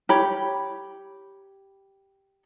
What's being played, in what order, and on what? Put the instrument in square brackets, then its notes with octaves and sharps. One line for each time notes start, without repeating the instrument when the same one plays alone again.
[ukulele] G4 C#5 B5